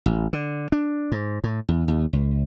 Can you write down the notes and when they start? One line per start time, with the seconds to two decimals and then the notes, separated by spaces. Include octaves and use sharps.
0.06 A1
0.33 D3
0.72 D4
1.12 G#2
1.44 A2
1.69 E2
1.88 D#2
2.13 C#2